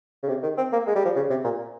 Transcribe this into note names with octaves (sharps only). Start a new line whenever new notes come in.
C#3
C3
D#3
C4
A#3
G#3
G3
F3
C#3
C3
A#2